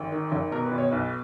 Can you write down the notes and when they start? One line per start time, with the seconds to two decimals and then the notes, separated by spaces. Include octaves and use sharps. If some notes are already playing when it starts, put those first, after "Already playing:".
Already playing: G#1
0.12 D#3
0.32 G#1
0.51 B2 A#4
0.65 B4
0.72 B2
0.78 C#5
0.91 B1 B4